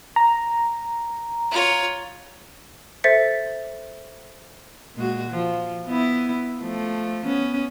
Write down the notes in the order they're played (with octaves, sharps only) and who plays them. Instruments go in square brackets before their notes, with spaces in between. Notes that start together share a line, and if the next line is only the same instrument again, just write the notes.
[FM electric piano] A#5
[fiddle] F4 C#5
[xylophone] A4 C5 E5 A6 B6 C#7
[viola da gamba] A#2 G#3 F#4
F3
B3 E4
F3 A3
B3 C#4